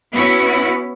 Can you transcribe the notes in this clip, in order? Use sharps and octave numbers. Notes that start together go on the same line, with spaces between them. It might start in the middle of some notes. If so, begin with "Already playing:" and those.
B3 C#4 E4 F#4